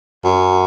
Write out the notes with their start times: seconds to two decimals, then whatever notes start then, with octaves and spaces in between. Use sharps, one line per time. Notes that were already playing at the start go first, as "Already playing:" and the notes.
0.24 F#2